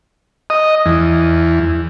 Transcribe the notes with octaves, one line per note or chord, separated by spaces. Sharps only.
D#5
E2